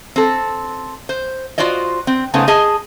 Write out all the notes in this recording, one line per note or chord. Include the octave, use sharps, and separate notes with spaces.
C4 A4
C5
F4 F#4 C5 D5 D#5
C4
C#3 A3 B3 D#4 C5
G#4 D#5 A5